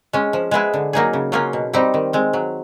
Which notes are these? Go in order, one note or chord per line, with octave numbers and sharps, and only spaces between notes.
G#3 C#4
F3
G#3 B3 E4 G#4
D3
F#3 A#3 D#4 G#4
C#3
F#3 A#3 C#4 F4
B2
G3 C4 D#4 G4
D#3
G#3 C4
F#3